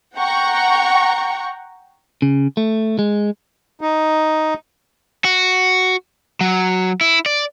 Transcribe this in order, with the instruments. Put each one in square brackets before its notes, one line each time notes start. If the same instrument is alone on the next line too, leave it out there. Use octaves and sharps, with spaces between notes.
[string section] F#5 G5 A#5 C#6
[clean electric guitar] C#3
A3
G#3
[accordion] D#4
[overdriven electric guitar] F#4
F#3
E4
D5